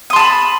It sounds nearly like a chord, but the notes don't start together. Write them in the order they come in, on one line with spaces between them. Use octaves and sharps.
D#6 C6 A5 B5